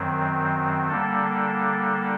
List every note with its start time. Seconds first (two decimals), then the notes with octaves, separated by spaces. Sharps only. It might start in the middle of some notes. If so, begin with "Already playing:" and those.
Already playing: F#2 D#3 F#3 C4
0.88 D3 G3 A#3 D4 A4